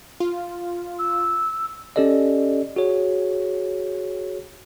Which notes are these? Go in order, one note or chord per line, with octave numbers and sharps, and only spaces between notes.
F4
E6
C#4 G4 A4 D5 D#5
F#4 G#4 C#5